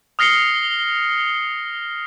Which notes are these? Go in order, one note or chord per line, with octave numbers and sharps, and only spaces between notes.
D#6 F6 A#6 C7 C#7 G7